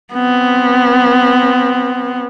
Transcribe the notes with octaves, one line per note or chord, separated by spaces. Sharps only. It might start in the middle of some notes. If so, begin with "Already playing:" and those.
B3 C4